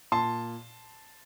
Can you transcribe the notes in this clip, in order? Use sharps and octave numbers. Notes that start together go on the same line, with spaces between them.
A#2 A5 C6